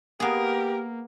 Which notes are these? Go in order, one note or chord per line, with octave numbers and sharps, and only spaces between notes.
A#3 B3 G4 G#4 A#4